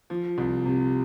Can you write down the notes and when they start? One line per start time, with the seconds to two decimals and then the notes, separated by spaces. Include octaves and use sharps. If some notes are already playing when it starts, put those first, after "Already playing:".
0.10 F3
0.38 C2
0.65 C3